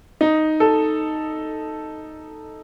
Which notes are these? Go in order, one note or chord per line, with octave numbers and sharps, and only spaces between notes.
D#4
A4